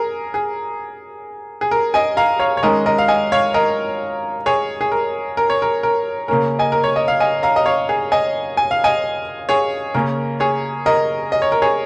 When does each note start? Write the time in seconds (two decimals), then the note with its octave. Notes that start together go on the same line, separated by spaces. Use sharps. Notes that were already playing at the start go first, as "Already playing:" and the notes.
Already playing: G#4 A#4
0.34 G#4
1.61 G#4
1.71 A#4
1.94 D#5 G#5
2.17 F5 A#5
2.39 C#5 F5
2.57 C#5
2.63 D#3 G#3 C#4 A#4 D#5
2.86 A#4 D#5
2.98 F5
3.08 D#5 G#5
3.32 C#5 F5
3.54 A#4 D#5
4.46 G#4 C#5
4.81 G#4
4.92 A#4
5.37 A#4
5.50 C#5
5.62 A#4
5.83 A#4
6.28 C#3 A#3 C#4 A#4
6.59 D#5 G#5
6.72 A#4
6.84 C#5
6.96 D#5
7.08 F5
7.20 D#5 G#5
7.43 F5 A#5
7.56 D#5
7.66 C#5 F5
7.89 G#4
8.12 D#5 G#5
8.57 G#5
8.71 F5
8.84 D#5 G#5
9.49 G#4 C#5
9.94 C#3 A#3 C#4 A#4
10.40 G#4 C#5
10.86 A#4 D#5
11.32 D#5
11.42 C#5
11.52 A#4
11.62 G#4 C#5